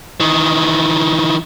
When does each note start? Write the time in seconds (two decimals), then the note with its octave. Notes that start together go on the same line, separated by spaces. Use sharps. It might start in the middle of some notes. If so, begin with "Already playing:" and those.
0.20 D#3 E3